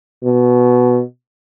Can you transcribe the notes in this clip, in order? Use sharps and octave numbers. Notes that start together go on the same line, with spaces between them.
B2